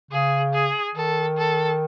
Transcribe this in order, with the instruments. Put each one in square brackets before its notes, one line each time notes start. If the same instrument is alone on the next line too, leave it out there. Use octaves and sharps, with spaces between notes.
[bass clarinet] C#3 [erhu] G#4
[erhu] G#4
[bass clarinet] D#3 [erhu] A4
[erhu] A4